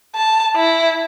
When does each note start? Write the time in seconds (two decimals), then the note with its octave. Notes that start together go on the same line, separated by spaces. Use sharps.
0.15 A5
0.57 E4